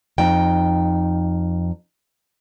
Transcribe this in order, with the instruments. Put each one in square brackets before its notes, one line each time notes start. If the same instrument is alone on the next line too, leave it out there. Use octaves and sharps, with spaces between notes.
[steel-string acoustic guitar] F2 D#4 G5